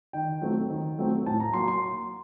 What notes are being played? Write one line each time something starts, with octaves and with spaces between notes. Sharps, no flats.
D#3 G5
F#3 A3 C4
D#3
F#3 A3 C4
A2 A5
A#5
F#3 A#3 C6
C6